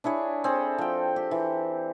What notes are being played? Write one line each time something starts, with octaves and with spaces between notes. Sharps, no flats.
D4 E4 G#4 C#5
C4 G#4 A4
F3 G5
G4
E3